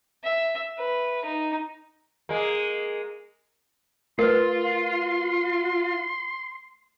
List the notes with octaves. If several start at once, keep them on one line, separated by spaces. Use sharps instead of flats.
E5
B4
D#4
G#3 A#3
A3 F4 A#4 B4 C6